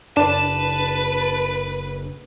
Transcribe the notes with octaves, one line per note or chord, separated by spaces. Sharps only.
F#1 D4 B4 A5